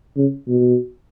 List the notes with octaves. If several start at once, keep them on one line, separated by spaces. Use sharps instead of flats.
C#3
B2